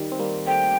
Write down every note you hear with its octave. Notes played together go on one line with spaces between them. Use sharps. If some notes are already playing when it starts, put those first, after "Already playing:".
Already playing: D#3 G3
C4
G3 A#3
A3 C4 G5